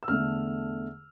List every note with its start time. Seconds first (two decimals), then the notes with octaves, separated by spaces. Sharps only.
0.03 E6
0.08 E2 D3 A3 F6